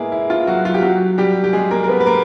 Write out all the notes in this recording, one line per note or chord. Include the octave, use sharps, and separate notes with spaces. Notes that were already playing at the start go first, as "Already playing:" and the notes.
Already playing: G#3 A#3 B3 E4 G#4
E4
F4
F#3 F#4
F4
G4
F#3 F#4
G3 G4
G4
G#3 G#4
A#3 A#4
A#4
B3 B4
B4
A#3 A#4